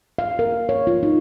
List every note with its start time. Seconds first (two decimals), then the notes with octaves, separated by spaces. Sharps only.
0.19 F5
0.39 A#4
0.69 C#5
0.87 F4
1.03 D#4